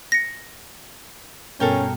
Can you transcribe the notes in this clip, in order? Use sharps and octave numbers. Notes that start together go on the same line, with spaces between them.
A#6 C#7
G2 B2 C#4 A4 A#4 G5